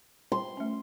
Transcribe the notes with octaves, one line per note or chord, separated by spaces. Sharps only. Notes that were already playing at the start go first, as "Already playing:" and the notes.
C6
A3 C#4